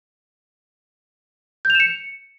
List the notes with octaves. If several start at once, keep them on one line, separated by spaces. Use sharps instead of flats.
G6
F7
E7
C#7